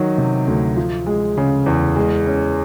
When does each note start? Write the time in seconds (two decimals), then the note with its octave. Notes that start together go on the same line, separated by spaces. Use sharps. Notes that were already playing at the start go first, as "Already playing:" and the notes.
Already playing: D#3 F#3
0.18 C3
0.47 D2
0.76 F3
1.07 G#3
1.37 C#3
1.66 E2
1.96 G#3
2.26 C#4